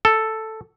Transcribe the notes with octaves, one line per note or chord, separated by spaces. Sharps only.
A4